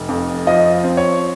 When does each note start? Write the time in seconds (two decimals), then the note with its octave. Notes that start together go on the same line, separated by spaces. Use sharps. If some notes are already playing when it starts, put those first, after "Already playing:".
Already playing: F1
0.09 F2
0.47 F3 D#5
0.84 C4
0.97 C#5